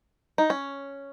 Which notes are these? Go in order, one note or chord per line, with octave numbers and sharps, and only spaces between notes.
D#4
C#4